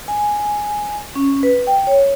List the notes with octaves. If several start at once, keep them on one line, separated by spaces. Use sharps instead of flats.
G#5
C#4
B4
G5
C#5